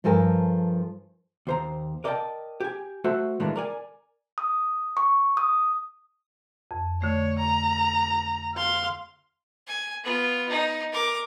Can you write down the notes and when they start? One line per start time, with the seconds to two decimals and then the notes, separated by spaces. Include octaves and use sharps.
0.04 G2 F3 A4 A#4 G#5
1.47 D#2 C5 A#5
2.04 A#4 D5 D#5 F5 G5 A5
2.60 G4 G#5
3.04 A3 F#4 C5 E5
3.40 A2 D#3 E3 G#3 A#3 D4
3.56 A#4 D5 G#5
4.38 D#6
4.97 C#6
5.37 D#6
6.71 F2
7.02 D3 A3 C#5
7.39 A#5
8.55 F5 C6
9.67 G#5
10.04 B3 F4
10.49 D#4
10.92 A#4 D6